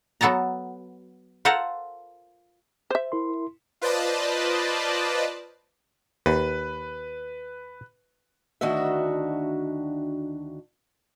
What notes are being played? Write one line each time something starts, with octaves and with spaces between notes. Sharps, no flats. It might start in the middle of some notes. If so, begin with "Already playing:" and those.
F#3 B3 A4 A5 A#5
F4 A4 A#4 C5 F5 F#5
C5 E5
E4 A#4 C6
F4 B4 C5 D5 D#5 A5
D#2 B4
D2 D#3 D4 F#4 D#5 E5